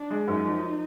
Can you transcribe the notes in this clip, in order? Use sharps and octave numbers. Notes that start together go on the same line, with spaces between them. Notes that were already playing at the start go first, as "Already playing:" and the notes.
Already playing: D4
G#3
F#2 D#4
F3